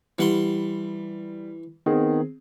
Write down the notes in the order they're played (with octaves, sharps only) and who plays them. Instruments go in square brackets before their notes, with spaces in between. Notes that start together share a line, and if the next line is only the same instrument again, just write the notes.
[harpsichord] E3 F#5 C6 [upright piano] G3
[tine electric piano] D#3 B3 [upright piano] C4 G#4